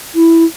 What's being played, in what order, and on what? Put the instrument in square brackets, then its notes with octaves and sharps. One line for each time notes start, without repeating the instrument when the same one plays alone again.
[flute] E4